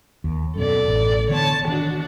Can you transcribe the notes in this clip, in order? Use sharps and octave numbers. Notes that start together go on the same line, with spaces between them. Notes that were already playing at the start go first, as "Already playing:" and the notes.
D#2
F#2 B2 A4 D5
A1
D3 E3 B3 C#5 A5
D#3 D4 F#4